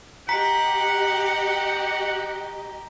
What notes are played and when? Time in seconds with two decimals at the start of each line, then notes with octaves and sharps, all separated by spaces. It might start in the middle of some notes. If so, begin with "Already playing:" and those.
0.29 G4 D#5 F#5 A#5 B6